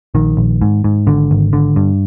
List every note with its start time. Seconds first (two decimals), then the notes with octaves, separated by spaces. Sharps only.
0.15 A#1 D#3
0.37 A#1
0.61 G#2
0.84 G#2
1.07 G#1 D3
1.31 G#1
1.53 D3
1.76 G2